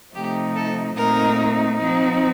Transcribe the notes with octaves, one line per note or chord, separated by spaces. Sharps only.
C3 F3 A3 D#4 G4
A4
A#2 A3 C4 D#4 A#4
F3 C4 D#4